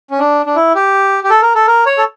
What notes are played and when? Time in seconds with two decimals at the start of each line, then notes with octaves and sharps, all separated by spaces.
0.11 C#4
0.19 D4
0.46 D4
0.56 E4
0.75 G4
1.24 G4
1.30 A4
1.42 A#4
1.55 A4
1.67 A#4
1.86 C#5
1.98 A4